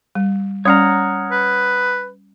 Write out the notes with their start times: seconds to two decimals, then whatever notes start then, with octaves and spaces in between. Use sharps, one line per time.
0.15 G3
0.65 G3 C#4 C#5 D5 F#5 A#5 D#6 F6
1.32 B4